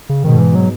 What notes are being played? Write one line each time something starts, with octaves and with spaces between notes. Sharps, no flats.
C#3
G#2 B2 D#3
E3
F#3